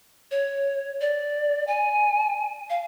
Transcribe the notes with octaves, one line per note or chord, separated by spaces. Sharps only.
C#5
D5
G#5
F5